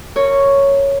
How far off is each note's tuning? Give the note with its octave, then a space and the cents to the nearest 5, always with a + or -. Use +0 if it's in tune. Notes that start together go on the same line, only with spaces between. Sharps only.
A#4 -25 C#5 +0